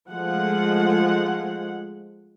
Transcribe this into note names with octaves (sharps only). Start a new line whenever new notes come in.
F3 G#3 A3 F#5